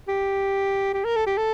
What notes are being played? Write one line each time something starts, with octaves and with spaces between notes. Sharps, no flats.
G4
G4
A#4
A4
G4
A4